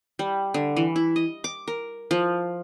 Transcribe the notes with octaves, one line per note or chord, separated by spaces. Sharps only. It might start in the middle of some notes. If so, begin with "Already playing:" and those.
G3
D3
E3
E4
D#5
D6
A#4
F3